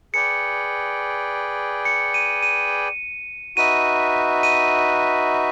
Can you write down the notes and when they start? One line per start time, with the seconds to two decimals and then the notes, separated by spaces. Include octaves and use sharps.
0.14 G#4 B4 D5 G5 C#7
1.85 C#7
2.14 D#7
2.43 D#7
3.57 D#4 F#4 B4 E5 D#7
4.43 D#7